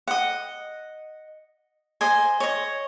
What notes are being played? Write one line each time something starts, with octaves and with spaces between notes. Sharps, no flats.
D#5 F#5
C5 D#5 G#5
C#5 D#5